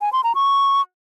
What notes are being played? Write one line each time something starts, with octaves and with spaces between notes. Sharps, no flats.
G#5
C6
A#5
C#6